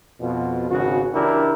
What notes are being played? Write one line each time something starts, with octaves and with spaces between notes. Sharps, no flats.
F2 B2 F4
G#1 C#3 F#4
C#2 E3 D4 E4 G4 A#4